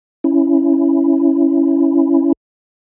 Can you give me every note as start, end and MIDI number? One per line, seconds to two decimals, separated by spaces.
0.24 2.33 61
0.24 2.33 64